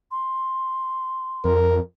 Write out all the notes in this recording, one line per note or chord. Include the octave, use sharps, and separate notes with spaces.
C6
F2 A#4